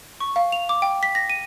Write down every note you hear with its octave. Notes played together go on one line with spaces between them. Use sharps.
C#6
F5
F7
D6
G5
B6
A#6
D#7